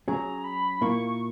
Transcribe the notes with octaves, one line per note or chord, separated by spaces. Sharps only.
F#3 C#4 G#4 A#5
B5
A#2 A#3 E4 C#6